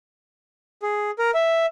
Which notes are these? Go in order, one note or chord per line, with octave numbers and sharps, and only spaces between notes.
G#4
A#4
E5